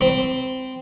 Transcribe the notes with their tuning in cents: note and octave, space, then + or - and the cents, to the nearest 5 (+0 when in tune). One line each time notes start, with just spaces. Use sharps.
C4 -15 C5 -10 B5 +0